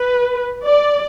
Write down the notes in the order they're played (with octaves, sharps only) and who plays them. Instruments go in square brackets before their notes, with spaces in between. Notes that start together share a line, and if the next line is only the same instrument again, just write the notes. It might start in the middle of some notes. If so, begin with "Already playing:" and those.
Already playing: [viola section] B4
D5